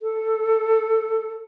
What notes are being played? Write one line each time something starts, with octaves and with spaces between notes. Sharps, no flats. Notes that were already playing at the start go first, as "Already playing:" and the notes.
A4